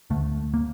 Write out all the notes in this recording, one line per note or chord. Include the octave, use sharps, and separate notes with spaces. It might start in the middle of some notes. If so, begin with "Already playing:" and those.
D2 D3 A3
A#3